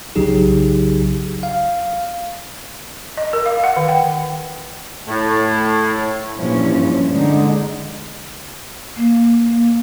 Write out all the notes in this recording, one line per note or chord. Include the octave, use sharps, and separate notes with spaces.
B1 C#3 F#3 D#4 G4 G#4
F5
D#5
A#4
F5
F#5
D#3
G5
A2
G2 A#2 E3 F3 C#4
D3 G#3 D#4
A#3